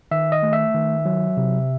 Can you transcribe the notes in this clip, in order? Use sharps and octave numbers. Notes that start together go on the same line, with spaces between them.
D#3 E5
D#5
A3
E5
D#3
F#3
C3